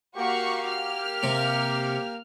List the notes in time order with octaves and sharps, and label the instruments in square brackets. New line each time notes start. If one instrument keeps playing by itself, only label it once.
[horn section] A#3 G4 [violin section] F#4 F5 C#6
[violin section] F6
[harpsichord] C3